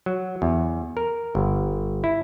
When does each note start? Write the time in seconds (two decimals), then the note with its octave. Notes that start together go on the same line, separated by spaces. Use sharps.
0.06 F#3
0.42 E2
0.97 A#4
1.35 G1
2.04 E4